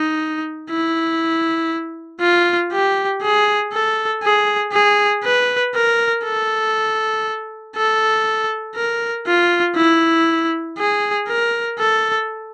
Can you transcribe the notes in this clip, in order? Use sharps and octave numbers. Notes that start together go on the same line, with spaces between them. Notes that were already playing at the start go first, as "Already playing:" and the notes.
Already playing: D#4
E4
F4
G4
G#4
A4
G#4
G#4
B4
A#4
A4
A4
A#4
F4
E4
G#4
A#4
A4